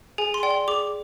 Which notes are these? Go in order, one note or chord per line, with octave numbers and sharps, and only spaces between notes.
G#4 G#5
C6
D5 G5
C6
G#4 D6